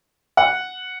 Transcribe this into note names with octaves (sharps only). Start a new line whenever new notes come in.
F#5